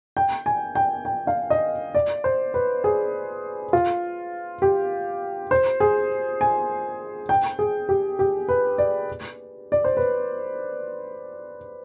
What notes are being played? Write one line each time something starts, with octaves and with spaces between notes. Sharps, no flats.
G5
G#5
G5
G5
F5
D#5
D5
C5
B4
G#4
F4
G4
C5
G#4
G#5
G5
G#4
G4
G4
B4
D5
D5
C5
B4